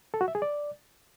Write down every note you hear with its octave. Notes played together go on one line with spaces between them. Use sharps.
A4
F#4
E5
G#4
D5